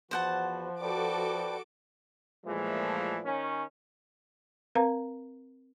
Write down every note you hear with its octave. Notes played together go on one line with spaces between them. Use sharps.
E2 F3 F#4 B4 C5 F#5 A5
F#4 A4 B4 D5 G5 D6
A#2 E3 F3 G#3 A3
D#3 C#4
C4 A#4 B4 F5 A#5